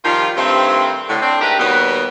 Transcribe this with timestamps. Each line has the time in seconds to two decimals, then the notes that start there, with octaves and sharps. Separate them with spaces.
0.04 D#3 F3 G3 F4
0.37 G2 D#3 A3 C4
1.08 A2 D3
1.22 C4 D4
1.41 G#2 A3 D4 G4 A#4 B4
1.58 D#2 B2 G3 B3